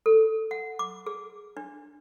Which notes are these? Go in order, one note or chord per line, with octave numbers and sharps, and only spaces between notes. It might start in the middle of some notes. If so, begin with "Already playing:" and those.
A4
F#5
D6
G#4
D4